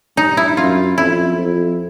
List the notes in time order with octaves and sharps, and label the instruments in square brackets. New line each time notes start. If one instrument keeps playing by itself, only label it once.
[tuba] G2 [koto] D#4
[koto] E4
[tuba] F#2 [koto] F4
[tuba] F2 [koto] E4
[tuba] F2